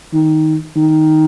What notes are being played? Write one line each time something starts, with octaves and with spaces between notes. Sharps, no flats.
D#3
D#3